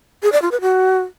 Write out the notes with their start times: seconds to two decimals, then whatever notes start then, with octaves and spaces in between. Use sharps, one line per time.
0.23 G#4
0.32 D5
0.42 F4
0.52 B4
0.61 F#4